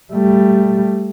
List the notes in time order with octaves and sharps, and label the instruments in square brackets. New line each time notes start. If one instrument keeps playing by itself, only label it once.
[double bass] G3 A3